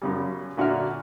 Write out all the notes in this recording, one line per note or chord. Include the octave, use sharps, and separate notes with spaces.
F#2 C#3 G3
A#2 D3 F#4 D5 E5 F6